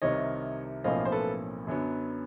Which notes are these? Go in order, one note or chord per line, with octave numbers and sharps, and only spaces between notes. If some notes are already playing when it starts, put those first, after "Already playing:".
C2 C3 D#3 C#5 D#5
B1 A2 F3 A#3 C#4 D#5 F5
C5
A4 B4
F#2 D3 F#3 B3